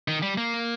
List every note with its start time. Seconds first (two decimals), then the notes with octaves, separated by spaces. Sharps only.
0.08 D#3
0.23 G3
0.38 A#3